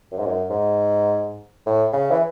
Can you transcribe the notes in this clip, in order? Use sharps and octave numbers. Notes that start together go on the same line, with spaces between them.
F#2
G#2
F#2
G#2
A2
C#3
E3